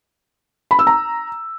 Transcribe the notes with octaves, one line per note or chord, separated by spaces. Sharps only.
B5
E6
A#5